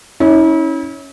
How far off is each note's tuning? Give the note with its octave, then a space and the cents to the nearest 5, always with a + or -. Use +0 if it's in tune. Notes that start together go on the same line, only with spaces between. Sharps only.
C#4 +0 E4 -40